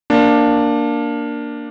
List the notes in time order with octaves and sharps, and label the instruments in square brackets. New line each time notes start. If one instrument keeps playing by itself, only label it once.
[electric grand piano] A#3 D4